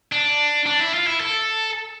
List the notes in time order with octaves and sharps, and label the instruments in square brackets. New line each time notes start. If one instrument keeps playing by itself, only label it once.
[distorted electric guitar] D4
D4
E4
F4
E4
A4